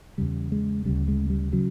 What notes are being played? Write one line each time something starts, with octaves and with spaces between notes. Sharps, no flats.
E2 C#3 G3
G#3
D2 C#3 G3
G#3
G3
C#3 F#3